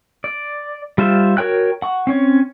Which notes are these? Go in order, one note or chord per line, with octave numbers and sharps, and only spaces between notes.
D5
G3 F4 C5 E5
F#4 A#4 C#5 G5 F#6
F#5 C#6
C4 C#4 C#5